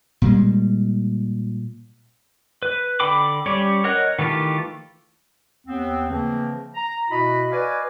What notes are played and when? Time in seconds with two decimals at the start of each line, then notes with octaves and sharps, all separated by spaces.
0.22 A#2 G3 G#3
2.63 B4
3.00 D3 A4 G5 B5 D6
3.46 G3 C#4 G4 C#5 D5
3.84 A#4 C#5 D#5 F#5 F#6
4.19 D#3 E3 A3 F4 G4
5.67 D#2 B3 C4
6.10 C#3 E3 F3 A3 A#3 C4
6.75 A#5
7.10 B2 E4 F#4 D#5 B5
7.51 F#4 B4 D5 D#5 F5 G#5